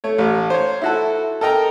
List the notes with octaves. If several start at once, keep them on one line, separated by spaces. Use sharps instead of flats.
A3 C#5
A1
C5 C#5
E4 F#4 A4
A4 A#4 D#5 G5 A#5